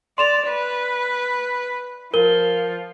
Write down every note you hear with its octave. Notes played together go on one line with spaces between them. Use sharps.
D5 C6 E7 F7
B4
F3 A#4 G7